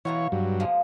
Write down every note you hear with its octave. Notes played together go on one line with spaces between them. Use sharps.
B2 E3 F4 C#5 A#5
G2 F#3
F3 G#3 A#3